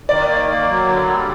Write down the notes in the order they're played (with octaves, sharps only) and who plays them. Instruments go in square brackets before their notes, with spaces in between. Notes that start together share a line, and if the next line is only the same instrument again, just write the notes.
[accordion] D#3 [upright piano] D5
[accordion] A#3
A#3
F#3
D3
G3